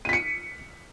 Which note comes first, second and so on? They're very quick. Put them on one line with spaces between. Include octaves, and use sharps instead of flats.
D#7 B6 C#7